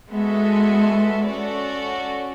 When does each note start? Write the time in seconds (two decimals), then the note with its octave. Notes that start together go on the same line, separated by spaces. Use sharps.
0.11 G#3 B3 F#4 A4 E5
1.27 C#4 F#4 A4 D5